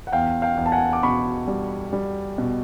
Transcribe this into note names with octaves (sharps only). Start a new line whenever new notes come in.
F#5
E2 F5 G5
F5 G5
E2
A5
F#5 G#5
D6
B2 B5 C#6
G3
G3
B2